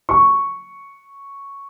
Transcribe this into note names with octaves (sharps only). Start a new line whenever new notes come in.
C#6